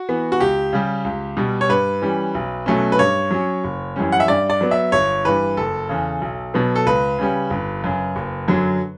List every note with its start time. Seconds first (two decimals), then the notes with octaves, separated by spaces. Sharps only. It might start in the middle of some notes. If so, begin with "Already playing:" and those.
Already playing: F#4
0.09 E3 B3
0.32 F#4
0.40 C#2 G4
0.73 C#3 G3
1.04 C#2
1.37 B2 G3
1.61 C#5
1.69 G2 B4
2.02 E3 G3 C#4
2.35 B1
2.66 B2 F#3 A3 C#4
2.92 B4
2.99 G2 C#5
3.31 F#3 C#4
3.64 F#1
3.96 F#2 E3 G3 C#4
4.12 F#5
4.20 E5
4.28 G2 D5
4.50 D5
4.61 F#3 B3
4.71 E5
4.92 G1 C#5
5.25 G2 E3 B4
5.57 F#1 A4
5.89 E2 C#3
6.21 B1
6.54 B2 F#3 B3
6.75 A4
6.86 C#2 B4
7.18 C#3 G3 C#4
7.50 G1
7.84 F#2 C#3
8.16 F#1
8.48 F#2 D3 F#3